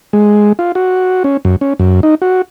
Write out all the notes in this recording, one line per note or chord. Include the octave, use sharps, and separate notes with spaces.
G#3
F4
F#4
C#4
F#2
C#4
F#2
D#4
F#4